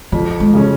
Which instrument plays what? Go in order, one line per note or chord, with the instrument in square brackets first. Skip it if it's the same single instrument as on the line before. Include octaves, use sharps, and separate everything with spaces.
[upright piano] F2 [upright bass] C#3
[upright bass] G#3
[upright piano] C#3 G#3 C#4